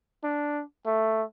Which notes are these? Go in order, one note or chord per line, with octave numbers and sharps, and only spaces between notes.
D4
A3